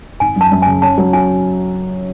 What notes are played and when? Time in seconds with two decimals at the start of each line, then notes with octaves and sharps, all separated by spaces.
0.20 G#1 G#5
0.36 F#2 A5
0.52 F#2
0.62 G#5
0.67 C#3
0.82 C#4 A5
0.98 F#3
1.13 F#4 G#5